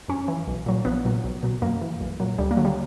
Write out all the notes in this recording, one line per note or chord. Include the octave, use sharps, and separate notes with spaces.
F#2 C#4
E3
B1
A#2 F#3
A#1 B3
A#2 F#3
B1
B2 F#3
F#2 A#3
E3
B1
A#2 F#3
D2 G3
A#3
D3 F#3
G3